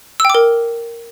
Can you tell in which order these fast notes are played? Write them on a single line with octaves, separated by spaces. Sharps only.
E6 G5 D6 A#4